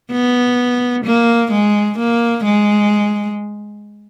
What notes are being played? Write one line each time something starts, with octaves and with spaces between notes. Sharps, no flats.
B3
A#3
G#3
A#3
G#3